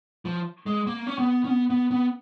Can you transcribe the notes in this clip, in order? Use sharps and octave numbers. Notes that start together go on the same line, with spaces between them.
F3
G#3
A#3
C#4
B3
C#4
B3
B3
B3